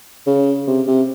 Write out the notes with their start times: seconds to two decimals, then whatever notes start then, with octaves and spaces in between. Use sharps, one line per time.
0.27 C#3
0.67 C3
0.87 C3